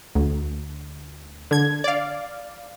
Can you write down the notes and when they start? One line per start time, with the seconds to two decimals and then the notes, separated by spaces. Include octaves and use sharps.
0.15 D2
1.51 D3 G#6
1.84 D5 F5